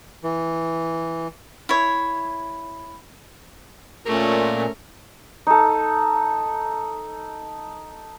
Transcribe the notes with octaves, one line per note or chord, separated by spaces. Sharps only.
E3
E4 C#5
A#2 A3 C#4 A#4
D#4 A4